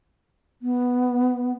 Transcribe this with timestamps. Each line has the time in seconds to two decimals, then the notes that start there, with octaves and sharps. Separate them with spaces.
0.62 B3